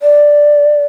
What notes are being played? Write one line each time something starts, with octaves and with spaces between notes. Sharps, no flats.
D5